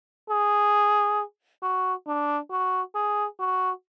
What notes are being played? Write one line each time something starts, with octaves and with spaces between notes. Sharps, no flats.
G#4
F#4
D4
F#4
G#4
F#4